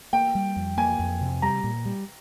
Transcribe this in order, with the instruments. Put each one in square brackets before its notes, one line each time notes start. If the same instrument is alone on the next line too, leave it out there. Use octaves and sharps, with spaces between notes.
[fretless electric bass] A#3 [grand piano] G5
[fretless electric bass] G3
F2
[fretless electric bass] A#3 [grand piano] G#5
[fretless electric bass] F2
C3
[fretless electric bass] G3 [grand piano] A#5
[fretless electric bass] A#2
G3